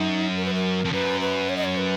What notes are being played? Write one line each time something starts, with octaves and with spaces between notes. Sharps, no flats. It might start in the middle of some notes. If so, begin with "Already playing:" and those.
Already playing: F#2 D#4
A#4
B4
A#4
F2
F#2 B4
B4
C#5
D#5
C#5
B4